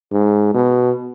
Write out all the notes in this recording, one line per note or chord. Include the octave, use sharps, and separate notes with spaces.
G#2
B2